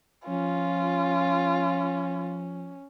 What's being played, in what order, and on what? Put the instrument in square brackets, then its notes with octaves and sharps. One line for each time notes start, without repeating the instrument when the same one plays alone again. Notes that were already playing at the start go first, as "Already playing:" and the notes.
[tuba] F3 [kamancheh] C#4 [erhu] F4